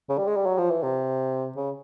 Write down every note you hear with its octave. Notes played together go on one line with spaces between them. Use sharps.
C#3
G3
G#3
G3
F#3
F3
E3
C3
C#3